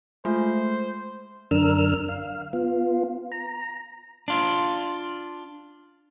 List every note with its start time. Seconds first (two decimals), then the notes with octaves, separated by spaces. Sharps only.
0.25 G#3 A3 F4 C5
1.51 F#2 D3 D4 A#4 E6 F6
2.09 F5
2.53 B3 F4
3.32 A#5
4.28 D4 F4